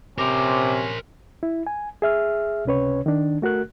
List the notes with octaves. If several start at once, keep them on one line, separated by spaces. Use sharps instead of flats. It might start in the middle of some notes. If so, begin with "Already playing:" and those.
C3 C#4 A#4 C5 D6
E4
G#5
G#4 E5 F6
C#2 C3 C#4 B4 C#5
D#3 D4
A3 F#4 A#4 F#6